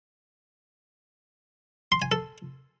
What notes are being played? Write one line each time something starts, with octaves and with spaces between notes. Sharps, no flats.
C6
G#5
A4